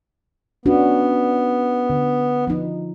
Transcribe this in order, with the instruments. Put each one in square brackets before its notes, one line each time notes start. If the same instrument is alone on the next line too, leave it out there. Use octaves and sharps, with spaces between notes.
[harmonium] B3 [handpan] C#4 D4 F#4
[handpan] D3
F3 D#4